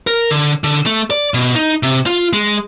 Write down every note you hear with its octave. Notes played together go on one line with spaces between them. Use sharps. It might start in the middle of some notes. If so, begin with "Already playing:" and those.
A#4
D3
D3
A3
D5
B2
D#4
C3
F4
G#3